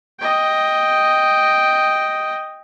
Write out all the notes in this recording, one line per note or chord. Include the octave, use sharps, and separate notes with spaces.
D#5 G5